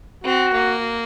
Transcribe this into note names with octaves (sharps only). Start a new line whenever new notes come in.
C4 F#4
A#3